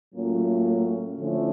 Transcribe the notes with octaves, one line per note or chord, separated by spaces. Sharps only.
A2 F#3 A#3 C#4 F4
D3 F3 A3 C#4 E4